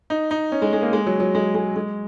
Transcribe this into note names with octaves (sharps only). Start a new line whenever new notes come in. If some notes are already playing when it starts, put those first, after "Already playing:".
D#4
D#4
C#4
G#3
G#3
A#3
G#3
F#3
F#3
G#3
G#3
G#3